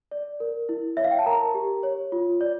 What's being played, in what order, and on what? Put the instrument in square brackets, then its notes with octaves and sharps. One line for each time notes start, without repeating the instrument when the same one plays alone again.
[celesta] D5
A#4
E4
C#5 E5
F5
G5
A5
A#4 A#5
G4
C#5
F4
D5